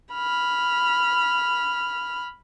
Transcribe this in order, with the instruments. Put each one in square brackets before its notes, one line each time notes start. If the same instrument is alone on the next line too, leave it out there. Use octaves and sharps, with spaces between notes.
[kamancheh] B5 F6